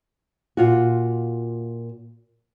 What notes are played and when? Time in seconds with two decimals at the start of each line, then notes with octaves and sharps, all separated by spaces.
0.57 A#2 F4 F#4